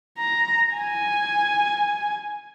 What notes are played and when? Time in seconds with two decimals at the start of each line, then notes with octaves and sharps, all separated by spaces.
0.18 A#5
0.74 G#5